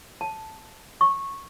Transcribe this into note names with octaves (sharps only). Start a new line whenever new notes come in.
A5
C#6